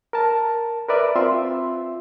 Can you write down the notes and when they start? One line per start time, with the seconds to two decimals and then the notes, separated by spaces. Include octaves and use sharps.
0.13 A#4 A5
0.89 A#4 B4 D5 E5
1.16 C4 F4 E5 C6